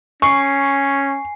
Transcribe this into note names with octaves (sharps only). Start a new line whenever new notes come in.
C#4 G#5 C#6 C7